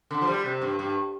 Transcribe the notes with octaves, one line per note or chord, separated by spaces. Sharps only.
D3
F3
G3
C3
G2
G2